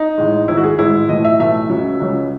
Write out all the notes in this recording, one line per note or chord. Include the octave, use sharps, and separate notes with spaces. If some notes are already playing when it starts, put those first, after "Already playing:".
Already playing: D#4
A1 A2 G#3
A1 G#2 D#3 G#3 E4
F#4
G#4
A1 G#2 D#3 G#3 E4
B1 A2 E3 A3 D#5
E5
B1 A2 E3 A3 E5
C#2 C#3 F#3
C#2 C#3 F#3